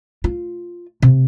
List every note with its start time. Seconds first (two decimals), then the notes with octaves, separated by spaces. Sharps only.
0.24 F4
1.02 C3